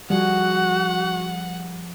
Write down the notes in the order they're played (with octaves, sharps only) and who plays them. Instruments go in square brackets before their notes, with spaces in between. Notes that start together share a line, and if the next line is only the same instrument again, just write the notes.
[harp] F3 G#4 [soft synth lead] G3 [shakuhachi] F#4 [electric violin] F#5